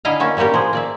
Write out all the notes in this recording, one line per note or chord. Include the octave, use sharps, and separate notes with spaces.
D3 E4 D#5 F5 G#5 A#5
A#3 C#4 F#4 E5
G3 A#3 F#4 G4 A#4
F3 G#4 C5
A#3 D5 E5